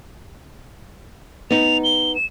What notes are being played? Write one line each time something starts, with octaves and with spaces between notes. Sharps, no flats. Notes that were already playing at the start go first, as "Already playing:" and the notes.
B3 D#4 F7
G7
E7